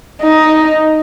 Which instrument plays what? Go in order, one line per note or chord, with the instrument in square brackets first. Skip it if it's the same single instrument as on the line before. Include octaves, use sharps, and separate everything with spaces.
[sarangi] D#4